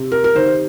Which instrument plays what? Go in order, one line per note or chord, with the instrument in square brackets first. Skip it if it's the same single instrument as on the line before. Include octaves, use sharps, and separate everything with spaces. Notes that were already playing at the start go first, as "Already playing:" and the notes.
Already playing: [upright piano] C3
[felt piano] A#4
A#4
[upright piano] D#3 [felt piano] C5